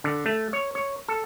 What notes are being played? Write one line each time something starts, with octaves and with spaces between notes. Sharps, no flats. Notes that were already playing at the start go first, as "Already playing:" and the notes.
D3
A3
C#5
C#5
A4